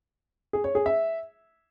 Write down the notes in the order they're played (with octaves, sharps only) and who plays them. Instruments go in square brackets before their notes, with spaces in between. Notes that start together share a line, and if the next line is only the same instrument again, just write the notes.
[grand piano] G#4
C#5
G#4
E5